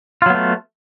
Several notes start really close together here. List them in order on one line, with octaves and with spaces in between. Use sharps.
F4 F#3 B3 A3